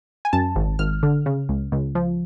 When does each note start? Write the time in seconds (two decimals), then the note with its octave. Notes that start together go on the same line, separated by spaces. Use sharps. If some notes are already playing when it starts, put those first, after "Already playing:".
0.25 G#5
0.33 F#2 A5
0.56 G#1
0.79 G#1 F6
1.03 D3
1.26 C#3
1.49 C#2
1.72 C#2
1.95 F3